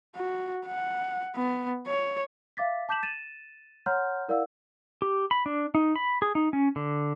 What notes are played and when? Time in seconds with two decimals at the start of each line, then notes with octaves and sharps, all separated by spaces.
0.16 F#4
0.67 F#5
1.35 B3
1.87 C#5
2.57 E5 F5 D6 A6 B6
2.89 A5 D6 G6 B6 E7 F#7
3.03 A6 D#7 E7
3.86 C#5 F#5 A#5 C6 F6 G6
4.28 E4 A#4 D5 F5 F#5 E6
5.02 G4
5.31 B5
5.46 D4
5.75 D#4
5.96 B5
6.22 G#4
6.35 D#4
6.53 C#4
6.76 D3